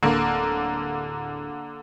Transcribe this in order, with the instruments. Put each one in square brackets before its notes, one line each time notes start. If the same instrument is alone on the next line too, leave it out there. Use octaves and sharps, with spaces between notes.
[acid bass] D1 [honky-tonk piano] D3 A#3